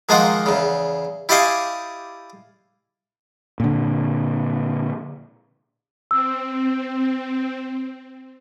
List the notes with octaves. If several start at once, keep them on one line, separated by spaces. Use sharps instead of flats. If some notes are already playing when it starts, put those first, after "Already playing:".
D#3 F3 G#3 A#3 F4 F#5
E2 C#3
E4 G4 D5 D#5 F5 G#5
A#2 D3
C4 E6